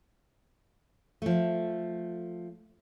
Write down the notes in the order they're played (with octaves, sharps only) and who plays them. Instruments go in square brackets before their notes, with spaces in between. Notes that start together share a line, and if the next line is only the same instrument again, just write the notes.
[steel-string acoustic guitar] F3 A3